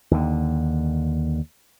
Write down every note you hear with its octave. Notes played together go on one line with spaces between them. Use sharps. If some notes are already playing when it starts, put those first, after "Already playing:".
D#2 D3